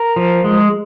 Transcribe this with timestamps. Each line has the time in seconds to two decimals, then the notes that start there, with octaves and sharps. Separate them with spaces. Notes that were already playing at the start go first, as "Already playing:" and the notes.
Already playing: A#4
0.16 F3
0.44 G#3